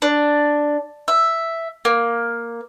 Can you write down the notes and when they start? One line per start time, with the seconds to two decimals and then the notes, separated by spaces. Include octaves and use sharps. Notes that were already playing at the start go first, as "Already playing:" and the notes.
0.02 D4
1.08 E5
1.85 A#3